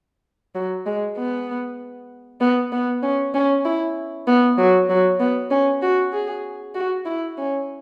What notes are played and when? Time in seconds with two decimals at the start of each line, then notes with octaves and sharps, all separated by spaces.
0.55 F#3
0.86 G#3
1.17 B3
2.41 B3
2.72 B3
3.03 C#4
3.34 C#4
3.65 E4
4.27 B3
4.58 F#3
4.89 F#3
5.19 B3
5.50 C#4
5.82 F#4
6.13 G#4
6.74 F#4
7.05 E4
7.38 C#4